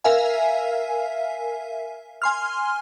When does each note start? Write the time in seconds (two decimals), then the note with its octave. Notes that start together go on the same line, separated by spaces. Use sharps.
0.04 A#4 E5 F5 G#5
2.22 G#5 C6 F6